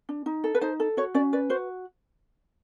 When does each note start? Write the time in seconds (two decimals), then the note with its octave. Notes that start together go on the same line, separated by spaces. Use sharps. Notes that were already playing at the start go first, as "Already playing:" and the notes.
0.09 D4
0.26 D#4
0.44 A4
0.55 B4
0.61 D#4 C5
0.80 A4
0.97 F#4 C#5
1.14 C#4 D5
1.33 B4 D5
1.50 F#4 C5